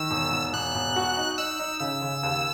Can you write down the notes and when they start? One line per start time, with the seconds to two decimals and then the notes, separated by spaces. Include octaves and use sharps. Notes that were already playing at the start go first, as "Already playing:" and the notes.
Already playing: D#3 E6
0.11 E1
0.32 E1
0.53 E1 F#6
0.75 E1
0.96 F#4
1.17 D#4
1.38 D#4 E6
1.59 D#4
1.80 C#3 E6
2.02 C#3
2.23 D#2